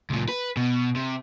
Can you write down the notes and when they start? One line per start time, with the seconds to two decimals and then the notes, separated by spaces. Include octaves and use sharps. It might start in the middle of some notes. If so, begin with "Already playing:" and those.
0.10 C#2 A#2
0.29 B4
0.57 B2
0.96 C3